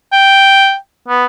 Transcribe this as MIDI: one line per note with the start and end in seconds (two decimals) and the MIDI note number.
0.13 0.75 79
1.08 1.25 59